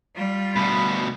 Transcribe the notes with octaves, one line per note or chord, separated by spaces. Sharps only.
G3 F4
D2 B2 B5